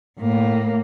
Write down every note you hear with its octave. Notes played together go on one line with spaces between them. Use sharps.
A2 A#3